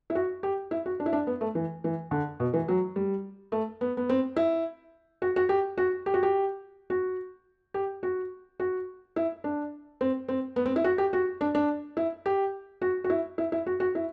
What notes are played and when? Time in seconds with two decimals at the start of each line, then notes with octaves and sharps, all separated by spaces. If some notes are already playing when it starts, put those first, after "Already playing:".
0.10 E4
0.15 F#4
0.43 G4
0.71 E4
0.86 F#4
1.00 D4
1.06 E4
1.13 D4
1.27 B3
1.41 A3
1.55 E3
1.84 E3
2.11 D3
2.40 B2
2.53 E3
2.68 F#3
2.96 G3
3.52 A3
3.81 B3
3.97 B3
4.09 C4
4.36 E4
5.22 F#4
5.36 F#4
5.49 G4
5.78 F#4
6.06 G4
6.14 F#4
6.23 G4
6.90 F#4
7.74 G4
8.03 F#4
8.60 F#4
9.16 E4
9.44 D4
10.01 C4
10.28 C4
10.56 B3
10.66 C4
10.76 E4
10.84 F#4
10.98 G4
11.13 F#4
11.41 D4
11.55 D4
11.97 E4
12.26 G4
12.82 F#4
13.04 F#4
13.10 E4
13.38 E4
13.52 E4
13.66 F#4
13.80 F#4
13.95 E4